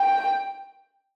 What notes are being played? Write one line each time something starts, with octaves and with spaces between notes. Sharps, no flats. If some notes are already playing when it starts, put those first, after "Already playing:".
Already playing: G5